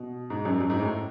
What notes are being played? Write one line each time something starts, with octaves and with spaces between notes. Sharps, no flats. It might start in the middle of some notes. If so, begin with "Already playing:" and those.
Already playing: B2
G#2
F#2
F#2
G#2
A2